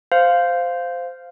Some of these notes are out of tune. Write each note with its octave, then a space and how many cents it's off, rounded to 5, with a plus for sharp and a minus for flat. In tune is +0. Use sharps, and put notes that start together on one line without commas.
C5 -10 F5 +0